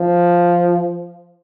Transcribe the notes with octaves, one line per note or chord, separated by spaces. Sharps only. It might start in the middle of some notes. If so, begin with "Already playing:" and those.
Already playing: F3